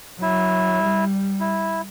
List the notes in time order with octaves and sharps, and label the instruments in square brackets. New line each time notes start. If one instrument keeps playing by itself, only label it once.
[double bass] F#3 [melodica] E4
[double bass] G3
[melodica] E4